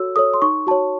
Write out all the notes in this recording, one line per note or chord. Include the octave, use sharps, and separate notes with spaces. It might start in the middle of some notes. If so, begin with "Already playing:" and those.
Already playing: F#4 A4 C#5 E6
A4 C#5 D#6
C6
D#4 C#6
F#4 C#5 A5